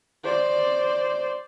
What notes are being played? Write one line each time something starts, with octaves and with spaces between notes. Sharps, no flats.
C5 D5